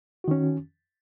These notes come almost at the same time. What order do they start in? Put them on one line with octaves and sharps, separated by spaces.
F#4 D#3 C#4